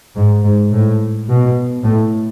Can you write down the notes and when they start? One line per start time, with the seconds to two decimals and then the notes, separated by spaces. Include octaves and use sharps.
0.16 G#2
0.43 G#2
0.72 A2
1.28 B2
1.84 A2